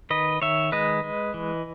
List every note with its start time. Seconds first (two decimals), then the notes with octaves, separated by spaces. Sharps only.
0.10 D#3 B4 D#5
0.42 D#3 C#5 E5
0.72 G#3 B4 D#5
1.04 G#3
1.34 E3